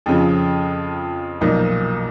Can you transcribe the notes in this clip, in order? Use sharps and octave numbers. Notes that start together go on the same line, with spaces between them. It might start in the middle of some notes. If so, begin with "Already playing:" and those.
F2 C#3 F3
B1 A#2 F3 A#3 D#4